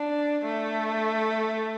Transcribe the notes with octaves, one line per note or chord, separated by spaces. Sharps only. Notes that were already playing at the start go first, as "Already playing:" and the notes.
Already playing: D4
A3